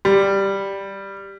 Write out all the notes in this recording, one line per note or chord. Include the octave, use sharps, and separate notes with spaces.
G3